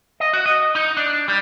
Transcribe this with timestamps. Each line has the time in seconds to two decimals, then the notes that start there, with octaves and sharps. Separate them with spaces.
0.20 D#5
0.33 F#4
0.46 D#5
0.75 D#4
0.97 D4
1.28 G3